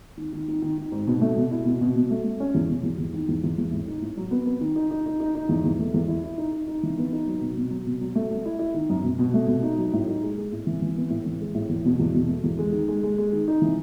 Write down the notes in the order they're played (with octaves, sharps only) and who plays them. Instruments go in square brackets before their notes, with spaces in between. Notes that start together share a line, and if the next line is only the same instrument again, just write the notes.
[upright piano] D#3
D#3
D#3
D#3
D#3
G#2
B2
A3
B2
E4
B2
B2
B2
A3
A3
C#4
E2
B2
E2
E2
D#3
E2
E2
E2
A2
D#4
A2
F#3
B3
B3
D#3
D#4
D#4
D#4
D#4
D#4
E2
E2
A3
E2
E4
E4
D#4
D#4
D#4
E3
B3
D#4
F#3
B2
B2
F#3
B2
F#3
A3
A3
E4
E4
D#3
F#2
B2
B2
A3
B2
D#4
F#3
A2
D#4
G#3
G#3
A2
E3
E3
B3
A2
E3
G#3
A2
E2
B2
E2
B2
A3
E2
G#3
D#3
G#3
G#3
G#3
D#3
D#4
E3